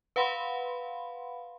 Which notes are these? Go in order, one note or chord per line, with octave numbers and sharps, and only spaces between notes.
B4 F5 F#5 B5 C6